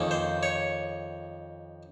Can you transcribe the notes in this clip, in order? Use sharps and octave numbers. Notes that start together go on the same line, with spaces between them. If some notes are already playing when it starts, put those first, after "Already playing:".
Already playing: F2 D#3 A#3 C#4
C5
C#5